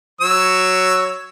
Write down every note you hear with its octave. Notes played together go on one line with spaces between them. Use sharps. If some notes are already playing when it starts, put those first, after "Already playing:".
F#3 C#5 E6